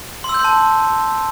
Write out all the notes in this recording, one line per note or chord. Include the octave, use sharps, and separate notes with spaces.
C6
E6
G6
C6
A5